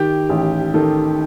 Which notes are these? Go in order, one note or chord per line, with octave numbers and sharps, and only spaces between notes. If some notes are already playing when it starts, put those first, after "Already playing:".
Already playing: D#3 G4
A1
D#3 A4